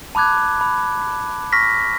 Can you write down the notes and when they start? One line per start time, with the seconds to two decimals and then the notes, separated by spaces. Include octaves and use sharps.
0.15 A5 B5 D6 F#6 G#6
0.61 B5
1.52 C#6 F6 A#6 B6